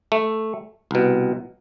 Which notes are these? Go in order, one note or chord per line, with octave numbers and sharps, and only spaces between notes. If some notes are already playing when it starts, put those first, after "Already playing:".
A3
C2 B2